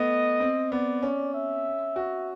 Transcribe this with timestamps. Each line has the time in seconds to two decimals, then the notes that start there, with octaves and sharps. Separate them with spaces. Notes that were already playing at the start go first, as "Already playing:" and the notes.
Already playing: A3 B3 D#5
0.40 C4
0.72 B3 D5
1.03 C#4
1.34 E5
1.96 F#4